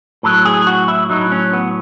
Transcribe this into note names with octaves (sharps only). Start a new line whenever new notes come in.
A2 F#3 A4
G#4
F#4
E4
A2 F#3 D#4
C#4
B3